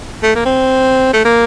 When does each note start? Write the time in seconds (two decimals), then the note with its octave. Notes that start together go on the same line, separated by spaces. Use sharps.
0.23 A3
0.35 A#3
0.46 C4
1.13 A3
1.25 A#3